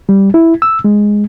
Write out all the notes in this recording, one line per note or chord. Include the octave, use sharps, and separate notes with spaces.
G3
E4
E6
G#3